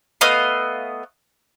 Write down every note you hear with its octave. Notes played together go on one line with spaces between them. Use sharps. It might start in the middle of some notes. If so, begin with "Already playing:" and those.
A3 B3 D#5 F5